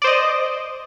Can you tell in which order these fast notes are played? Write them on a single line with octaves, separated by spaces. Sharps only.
D5 C5 D#5